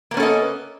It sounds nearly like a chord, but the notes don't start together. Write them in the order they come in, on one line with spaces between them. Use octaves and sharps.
A#3 B3 C#4 A4 D#5